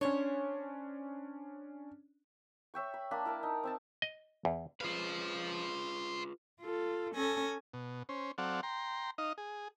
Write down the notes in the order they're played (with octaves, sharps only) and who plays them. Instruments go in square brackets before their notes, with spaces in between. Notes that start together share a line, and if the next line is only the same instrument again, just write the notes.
[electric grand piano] C#4 D4 [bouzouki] C5 C#5
[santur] C#5 E5 G5 C#6
B5
A#3 D4 B5
E4 A#4 A5
D#4
C4 E5 A5
[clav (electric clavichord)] D#5
E2
[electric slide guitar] F4 G#4 B4 [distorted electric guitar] C5 F5
[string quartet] F4 A4
C#4 A4 G#5 A#6
[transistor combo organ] B2
C#4 C5
F#3 C4 A4 D5 F5 F#5
G5 A#5 C6
D#4 D#5 F5
G#4